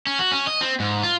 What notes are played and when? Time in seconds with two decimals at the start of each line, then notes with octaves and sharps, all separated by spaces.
0.07 C#4
0.19 F#4
0.32 C#4
0.47 D#5
0.61 C4
0.80 G#2
1.03 F4